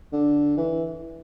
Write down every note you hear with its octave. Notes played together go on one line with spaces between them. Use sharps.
D3
E3